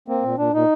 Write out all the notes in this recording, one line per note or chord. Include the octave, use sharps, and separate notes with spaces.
A#3 C4
A#2
A#2 D4
A#2 D#4